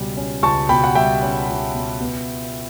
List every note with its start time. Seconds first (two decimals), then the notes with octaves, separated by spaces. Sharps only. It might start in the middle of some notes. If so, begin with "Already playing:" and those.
Already playing: C#2 B2 G3 C#4
0.17 C#4
0.43 C#2 A5 C#6
0.69 B2 G5 B5
0.84 F#5
0.95 G3 E5 G5
1.22 C#4
1.48 C#2
1.74 B2
2.00 B3